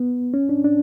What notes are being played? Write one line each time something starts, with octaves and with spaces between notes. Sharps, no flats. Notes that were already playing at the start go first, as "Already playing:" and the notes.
Already playing: B3
C#4
D4
D4